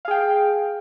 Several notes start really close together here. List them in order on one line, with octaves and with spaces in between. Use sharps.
F5 G#4 G5